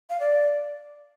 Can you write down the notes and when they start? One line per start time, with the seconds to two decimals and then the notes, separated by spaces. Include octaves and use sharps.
0.10 F5
0.20 D5